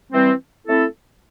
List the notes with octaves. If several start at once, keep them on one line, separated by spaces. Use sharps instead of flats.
E3 G3 C4
A3 C4 E4 A4